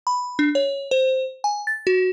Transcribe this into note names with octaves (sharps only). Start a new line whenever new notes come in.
B5
D4
C#5
C5
G#5
A6
F#4